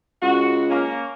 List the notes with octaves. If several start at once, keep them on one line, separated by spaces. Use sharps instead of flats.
C#2 F#4
A#3 C#4